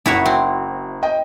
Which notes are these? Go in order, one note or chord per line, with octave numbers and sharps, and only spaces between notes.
F#1 E4 F#4 C#5
C4
D#5 G5